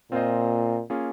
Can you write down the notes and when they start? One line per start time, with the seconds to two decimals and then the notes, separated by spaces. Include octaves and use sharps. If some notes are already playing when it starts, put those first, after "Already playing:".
0.12 A#2 C4 F4 C5 D#5
0.90 A#3 C#4 F4 G#4